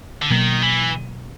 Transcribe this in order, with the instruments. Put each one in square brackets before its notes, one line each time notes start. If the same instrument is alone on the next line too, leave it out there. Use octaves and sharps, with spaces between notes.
[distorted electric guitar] D3
[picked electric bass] B2 F#3 A#3 [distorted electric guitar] D#3
[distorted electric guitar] E3